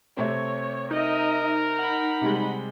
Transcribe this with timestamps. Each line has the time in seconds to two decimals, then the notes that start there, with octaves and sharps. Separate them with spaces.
0.17 C3 A3 C4 C#5
0.91 D#4 A#4 D#5 E5
1.78 F#5 B5
2.21 C3 G3 G#3